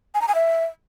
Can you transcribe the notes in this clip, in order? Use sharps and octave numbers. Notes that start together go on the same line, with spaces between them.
G#5
A#5
G#5
E5